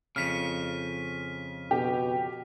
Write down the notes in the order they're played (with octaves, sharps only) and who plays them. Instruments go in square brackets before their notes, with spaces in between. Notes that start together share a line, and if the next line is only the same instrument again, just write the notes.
[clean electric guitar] F2 C#3 [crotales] F6 B6 D#7
[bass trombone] B2 [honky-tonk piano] G4